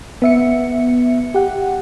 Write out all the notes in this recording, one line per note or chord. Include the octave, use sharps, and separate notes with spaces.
B3 E5 C#7
G4 F#5